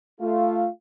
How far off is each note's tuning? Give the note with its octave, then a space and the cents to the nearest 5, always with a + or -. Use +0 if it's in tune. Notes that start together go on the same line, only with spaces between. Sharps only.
A3 +0 F4 -10 F5 +0